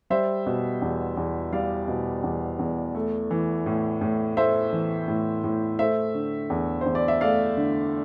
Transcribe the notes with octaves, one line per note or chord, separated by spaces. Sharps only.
G3 C5 E5
B2
E2
E2
G3 D5 F5
B2
E2
E2
A3
E3
A2
A2
A3 C5 E5
E3
A2
A2
A3 C5 E5
D3
E2
C5
E2
D5
E5
A3 D5 F5
D3